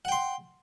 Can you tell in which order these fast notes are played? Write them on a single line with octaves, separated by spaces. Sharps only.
F#5 G5 C6